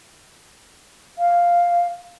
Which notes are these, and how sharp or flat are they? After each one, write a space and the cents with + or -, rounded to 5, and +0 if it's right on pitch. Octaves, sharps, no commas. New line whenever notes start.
F5 +0